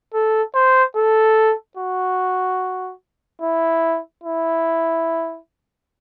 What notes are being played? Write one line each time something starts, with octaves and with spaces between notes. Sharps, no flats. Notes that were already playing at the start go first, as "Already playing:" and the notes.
A4
C5
A4
F#4
E4
E4